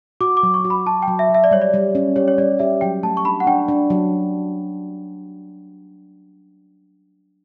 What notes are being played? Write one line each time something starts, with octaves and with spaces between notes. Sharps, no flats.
F#4 D6
D6
F#3
C#6
F#4
B5
F#4 A5
G5
F#3
E5
F#3
E5
D5
G3 C#5
D5
G3
C#4
G4 C#5
C#5
G3 D5
G4 E5
F#3 G5
A3 A5
C#6
D4 B5
F#5
D4 G5
D4
F#3